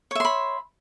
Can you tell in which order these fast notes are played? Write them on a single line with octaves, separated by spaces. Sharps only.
C#5 E5 C6 B5